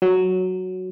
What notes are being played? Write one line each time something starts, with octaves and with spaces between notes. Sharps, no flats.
F#3